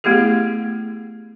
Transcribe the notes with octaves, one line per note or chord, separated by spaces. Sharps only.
A3 B3 E4 G4 G#4